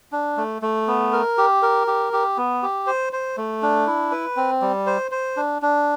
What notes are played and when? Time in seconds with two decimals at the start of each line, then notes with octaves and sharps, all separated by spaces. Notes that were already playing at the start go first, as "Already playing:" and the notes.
0.12 D4
0.37 A3
0.62 A3
0.88 B3
1.12 A#4
1.38 G4
1.62 A#4
1.87 G4
2.13 G4
2.37 B3
2.63 G4
2.87 C5
3.13 C5
3.37 A3
3.62 D4
3.87 E4
4.12 B4
4.37 C4
4.62 G3
4.86 C5
5.11 C5
5.37 D4
5.62 D4